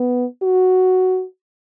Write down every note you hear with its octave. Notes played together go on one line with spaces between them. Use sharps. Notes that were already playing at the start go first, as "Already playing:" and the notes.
Already playing: B3
F#4